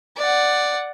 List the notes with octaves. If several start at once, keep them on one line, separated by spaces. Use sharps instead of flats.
D5 F#5